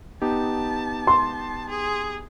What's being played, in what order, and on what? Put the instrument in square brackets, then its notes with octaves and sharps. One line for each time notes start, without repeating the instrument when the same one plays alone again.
[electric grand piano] B3 D#4 G4 [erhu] A5
[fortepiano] C6
[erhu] G#4